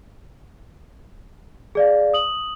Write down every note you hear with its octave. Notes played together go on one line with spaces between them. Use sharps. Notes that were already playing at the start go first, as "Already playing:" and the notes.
G#4 D5 F5
D#6 F#7